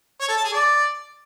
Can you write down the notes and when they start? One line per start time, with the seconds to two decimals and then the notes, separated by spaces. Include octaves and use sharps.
0.21 C#5
0.29 A4
0.37 A5
0.45 G#4
0.53 D5